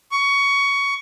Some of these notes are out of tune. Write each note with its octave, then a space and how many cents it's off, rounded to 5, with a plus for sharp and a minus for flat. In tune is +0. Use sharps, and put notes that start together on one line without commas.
C#6 +15